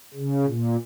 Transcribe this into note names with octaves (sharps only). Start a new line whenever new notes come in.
C#3
A#2